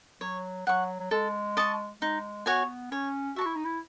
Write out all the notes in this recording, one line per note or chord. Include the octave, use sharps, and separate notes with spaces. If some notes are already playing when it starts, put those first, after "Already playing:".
F#3 C#5
F#3 F#5 C#6
F#3
G#3 A4
D#5 A5 C#6
G#3 D#4
B3 F#4 C#5 G#5
C#4 C#5
E4 F#4 E5 A5 C#6
D#4
E4